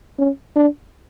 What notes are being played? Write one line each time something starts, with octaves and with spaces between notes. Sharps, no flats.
C#4
D4